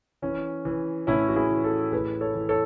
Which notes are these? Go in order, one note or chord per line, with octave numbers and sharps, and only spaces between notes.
E3 C#4
E3
A2 C#4 E4
F#4
E4 G#4
E3
F#4 A4
A2 G#4 B4
A4 C#5
E3
A4 C#5